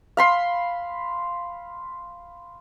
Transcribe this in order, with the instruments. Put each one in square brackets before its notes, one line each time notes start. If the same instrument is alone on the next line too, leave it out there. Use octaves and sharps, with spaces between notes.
[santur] F5 B5 C6